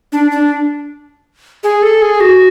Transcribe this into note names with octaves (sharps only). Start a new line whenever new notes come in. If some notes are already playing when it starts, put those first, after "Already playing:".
D4
D4
G#4
A4
G#4
F#4